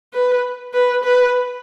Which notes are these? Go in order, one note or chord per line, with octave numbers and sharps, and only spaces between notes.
B4
B4
B4